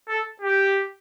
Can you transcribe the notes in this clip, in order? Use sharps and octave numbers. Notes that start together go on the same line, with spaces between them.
A4
G4